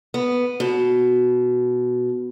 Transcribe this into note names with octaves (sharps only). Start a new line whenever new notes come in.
B3
B2